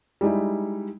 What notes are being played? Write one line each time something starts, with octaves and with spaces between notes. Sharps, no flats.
G3 G#3 D#4 E4